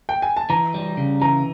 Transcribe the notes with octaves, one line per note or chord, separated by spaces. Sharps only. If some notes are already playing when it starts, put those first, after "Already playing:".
G5
G#5
A5
E3 A#5
G3
C#3
E3 A#5